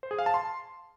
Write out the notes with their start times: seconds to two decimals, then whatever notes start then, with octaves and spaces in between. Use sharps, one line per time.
0.03 C5
0.11 G#4
0.19 F5
0.26 A5
0.34 C6